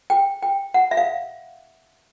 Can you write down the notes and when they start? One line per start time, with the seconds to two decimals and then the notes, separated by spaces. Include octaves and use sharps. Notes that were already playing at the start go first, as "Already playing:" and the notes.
0.10 G5
0.43 G5
0.74 F#5
0.91 E5
0.97 F5